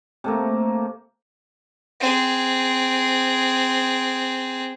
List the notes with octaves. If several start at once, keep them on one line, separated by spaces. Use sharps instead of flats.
C3 A3 A#3
C4 G#4